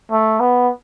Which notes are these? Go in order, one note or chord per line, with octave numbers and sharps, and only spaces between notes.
A3
B3